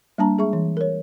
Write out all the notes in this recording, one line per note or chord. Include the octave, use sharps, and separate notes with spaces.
G3 A#3 D4 A5 A#5
G#3 G#4 E5 C#6
E3
A#4 C#5